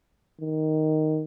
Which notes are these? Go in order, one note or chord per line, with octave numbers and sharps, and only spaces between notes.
D#3